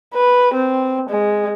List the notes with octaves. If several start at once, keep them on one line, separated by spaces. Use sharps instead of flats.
B4
C4
G#3